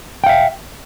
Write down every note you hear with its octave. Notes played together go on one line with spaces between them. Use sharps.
E5 F5 G5